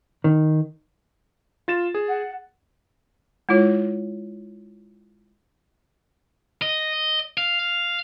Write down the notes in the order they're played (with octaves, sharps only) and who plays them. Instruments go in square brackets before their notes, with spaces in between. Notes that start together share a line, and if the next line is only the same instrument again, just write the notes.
[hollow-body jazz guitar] D#3
[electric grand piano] F4 A6 E7
G#4
[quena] F#5
[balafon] G#3 E4 F4 C#5
[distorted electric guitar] D#5
F5